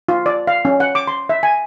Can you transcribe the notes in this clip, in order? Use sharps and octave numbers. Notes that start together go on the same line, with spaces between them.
F4
D5
F5
C#4
F#5
D6
C6
E5
G#5